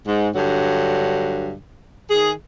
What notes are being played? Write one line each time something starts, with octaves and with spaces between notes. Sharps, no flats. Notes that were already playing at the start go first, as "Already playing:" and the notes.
G#2
G2 D3 F#3
D#3 G#4